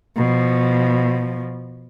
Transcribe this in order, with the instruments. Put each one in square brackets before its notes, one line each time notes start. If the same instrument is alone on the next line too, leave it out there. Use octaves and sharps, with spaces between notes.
[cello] B2 F3